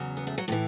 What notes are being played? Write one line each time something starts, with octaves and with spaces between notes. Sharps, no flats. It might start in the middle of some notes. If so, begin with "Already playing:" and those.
Already playing: E2 C#3 F#3
B3
A3
F#3
A2 E3 F#3